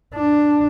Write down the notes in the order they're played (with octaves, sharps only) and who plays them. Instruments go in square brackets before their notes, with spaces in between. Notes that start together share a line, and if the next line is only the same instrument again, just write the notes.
[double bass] D4